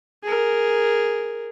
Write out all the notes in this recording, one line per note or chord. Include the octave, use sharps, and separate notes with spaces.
G#4 A#4